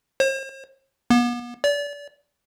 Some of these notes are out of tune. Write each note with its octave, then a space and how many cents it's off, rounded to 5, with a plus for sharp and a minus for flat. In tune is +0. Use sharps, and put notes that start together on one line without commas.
C5 +45
B3 -40
D5 -30